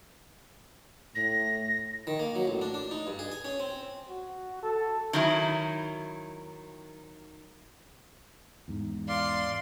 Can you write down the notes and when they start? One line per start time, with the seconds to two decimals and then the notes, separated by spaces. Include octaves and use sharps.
1.15 A2 A#6
2.07 D#3
2.20 A#3
2.35 F#3
2.47 A1
2.62 D4
2.74 D4
2.91 D#4
3.07 G2
3.19 G#4
3.32 G#5
3.45 C#4
3.59 C4
4.09 F#4
4.63 A4
5.13 D#3 F#3 E4
8.68 E2 G#2
9.08 D5 F5 C6